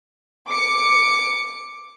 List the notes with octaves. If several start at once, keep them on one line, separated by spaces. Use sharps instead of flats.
D6 C#7